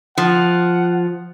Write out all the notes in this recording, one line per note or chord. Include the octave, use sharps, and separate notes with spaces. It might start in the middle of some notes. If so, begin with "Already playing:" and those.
F3 F#5